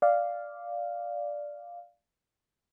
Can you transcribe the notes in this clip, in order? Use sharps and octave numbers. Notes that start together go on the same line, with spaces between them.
D5 F5